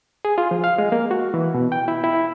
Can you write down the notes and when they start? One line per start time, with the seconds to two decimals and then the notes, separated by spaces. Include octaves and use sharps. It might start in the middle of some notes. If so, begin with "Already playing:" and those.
0.25 G#4
0.38 F4
0.51 F3
0.64 F5
0.78 G#3
0.92 A#3
1.11 F#4
1.34 E3
1.54 B2
1.72 G5
1.88 E4
2.04 E4